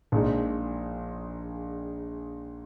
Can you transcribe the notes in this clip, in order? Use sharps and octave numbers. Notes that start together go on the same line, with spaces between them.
A#1 A#2 G#3 D#4